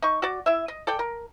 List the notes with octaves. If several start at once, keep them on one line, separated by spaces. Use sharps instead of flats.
D#4 C#6
F#4 D5
E4 E5
D#5
A4 D5 G5
A#4